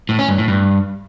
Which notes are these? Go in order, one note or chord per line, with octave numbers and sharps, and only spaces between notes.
A2
C#4
G2
A2
G2